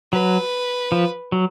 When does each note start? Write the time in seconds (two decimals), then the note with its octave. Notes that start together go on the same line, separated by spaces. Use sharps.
0.12 F#3 B4
0.92 F3
1.32 F#3